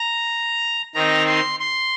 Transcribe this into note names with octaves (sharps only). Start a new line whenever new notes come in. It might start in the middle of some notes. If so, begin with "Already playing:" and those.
Already playing: A#5
D#3 C4 D#4 A#5
C6
C6